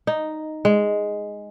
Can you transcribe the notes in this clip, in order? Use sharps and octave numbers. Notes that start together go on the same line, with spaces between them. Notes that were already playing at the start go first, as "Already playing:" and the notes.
D#4
G#3